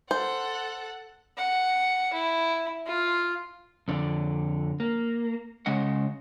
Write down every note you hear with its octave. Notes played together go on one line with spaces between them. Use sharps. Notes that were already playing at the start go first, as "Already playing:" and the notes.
A4 C5 F#5
F#5
E4
F4
F2 D3 D5
A#3
C#3 G#3 D#5 F#5